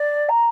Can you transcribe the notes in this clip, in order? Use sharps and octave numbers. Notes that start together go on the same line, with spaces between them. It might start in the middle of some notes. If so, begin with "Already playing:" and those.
Already playing: D5
A#5